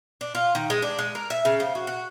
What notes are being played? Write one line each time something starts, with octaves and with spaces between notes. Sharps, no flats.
D4
F4
D#3
G#3
D4
G#3
A#4
E5
C#3
F3
F#4
F#4